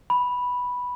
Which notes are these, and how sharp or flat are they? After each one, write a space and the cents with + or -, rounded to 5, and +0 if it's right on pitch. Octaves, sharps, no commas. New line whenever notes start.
B5 -5